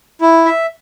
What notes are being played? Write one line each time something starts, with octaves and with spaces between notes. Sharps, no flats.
E4
E5